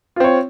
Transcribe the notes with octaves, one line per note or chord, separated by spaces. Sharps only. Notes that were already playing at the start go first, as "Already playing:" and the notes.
C4 F4 C#5